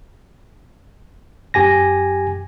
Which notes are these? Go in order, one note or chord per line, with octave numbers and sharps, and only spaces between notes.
F#2 G4 G#5 A#6